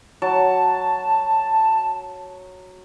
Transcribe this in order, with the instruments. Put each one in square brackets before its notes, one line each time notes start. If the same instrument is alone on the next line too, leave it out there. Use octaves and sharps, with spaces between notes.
[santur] F#3 [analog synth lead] A5